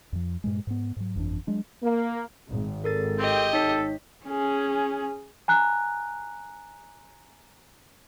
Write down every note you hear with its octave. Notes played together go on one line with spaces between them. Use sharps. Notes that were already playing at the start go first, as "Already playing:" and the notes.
F2 F3
G2 A#2 G#3
G#2 B3
G#2 F#3
G1 F2 E3 D4
F#3 G#3 D4
A#3
G#1
A4 A#4 A6
C4 G4 D#5
D#4 A4 C#5 B6
C#4 G#4
G#5 A#5 F#6